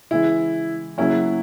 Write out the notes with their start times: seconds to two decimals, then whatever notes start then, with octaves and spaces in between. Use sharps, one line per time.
0.11 C#3 E3 G#3 E4
0.98 C#3 F#3 A#3 C#4 E4